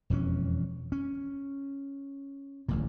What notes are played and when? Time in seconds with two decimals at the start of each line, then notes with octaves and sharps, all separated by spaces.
0.10 E1 F2 E3 C#4
0.92 C#4
2.68 D1 A1 A#2